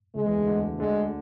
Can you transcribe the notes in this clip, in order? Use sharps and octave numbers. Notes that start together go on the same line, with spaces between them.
C#2 C#3 G#3
E2 E3
D2 D3
D2 D3
D2 D3 G#3